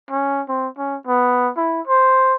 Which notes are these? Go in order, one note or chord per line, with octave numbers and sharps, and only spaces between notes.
C#4
C4
C#4
B3
E4
C5